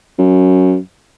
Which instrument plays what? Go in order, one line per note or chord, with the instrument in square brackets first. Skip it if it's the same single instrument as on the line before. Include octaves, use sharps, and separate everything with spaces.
[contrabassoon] F#2